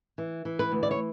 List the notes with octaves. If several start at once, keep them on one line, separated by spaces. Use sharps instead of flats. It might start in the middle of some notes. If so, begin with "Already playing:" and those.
E3
E3
B4
D2
D5
C#5